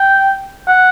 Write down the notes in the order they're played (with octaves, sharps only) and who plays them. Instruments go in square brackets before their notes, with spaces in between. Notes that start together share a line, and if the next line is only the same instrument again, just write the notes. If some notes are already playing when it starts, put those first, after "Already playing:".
Already playing: [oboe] G5
F#5